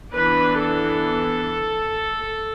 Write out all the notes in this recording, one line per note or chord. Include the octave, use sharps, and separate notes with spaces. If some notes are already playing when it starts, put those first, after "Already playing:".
E3 B3 D4 B4
A4